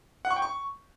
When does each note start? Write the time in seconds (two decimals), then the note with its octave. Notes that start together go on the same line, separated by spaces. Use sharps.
0.25 F#5
0.31 C#6
0.36 G5
0.42 C#6